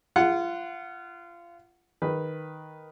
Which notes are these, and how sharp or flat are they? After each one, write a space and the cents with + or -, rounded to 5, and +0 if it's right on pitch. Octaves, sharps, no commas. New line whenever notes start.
F4 -25 F#5 +0
D#3 +0 B4 +0